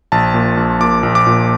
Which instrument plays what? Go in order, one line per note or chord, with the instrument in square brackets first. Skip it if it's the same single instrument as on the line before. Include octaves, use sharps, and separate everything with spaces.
[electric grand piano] A#1 A5
A#2
A#1
A#2 D6
A#1
D6
A#2